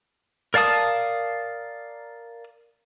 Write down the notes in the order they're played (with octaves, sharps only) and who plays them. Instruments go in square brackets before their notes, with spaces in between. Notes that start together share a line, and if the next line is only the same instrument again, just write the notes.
[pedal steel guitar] A#4 D5 F5 A5 D#6